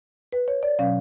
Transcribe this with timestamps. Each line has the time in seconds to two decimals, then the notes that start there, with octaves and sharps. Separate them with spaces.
0.33 B4
0.48 C#5
0.63 D5
0.79 B2 F#3 C#4 F5